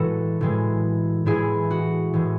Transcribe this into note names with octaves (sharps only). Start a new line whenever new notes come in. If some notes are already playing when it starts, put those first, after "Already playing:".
Already playing: A2 E3 G#3 F#4 A4 B4
A2 E3 G#3
A2 E3 G#3 E4 G#4
F#4
A2 E3 G#3